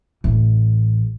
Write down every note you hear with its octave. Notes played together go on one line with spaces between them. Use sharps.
A1